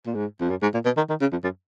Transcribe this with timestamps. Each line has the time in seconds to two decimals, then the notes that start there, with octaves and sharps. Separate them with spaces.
0.06 A#2
0.15 G#2
0.40 F2
0.50 F#2
0.62 G#2
0.74 A#2
0.85 B2
0.97 D#3
1.09 D#3
1.21 C#3
1.32 F2
1.44 F#2